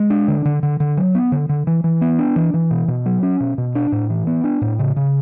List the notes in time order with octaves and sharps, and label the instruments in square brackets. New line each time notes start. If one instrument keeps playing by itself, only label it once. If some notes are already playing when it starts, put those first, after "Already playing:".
Already playing: [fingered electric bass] G#3
D4
D3
D3
D3
D3
F#3
B3
D3
D3
E3
E3
B3
D4
E3
E3
B2
B2
F#3
C#4
B2
B2
D4
A2
E3
B3
D4
A2
C#3
C#3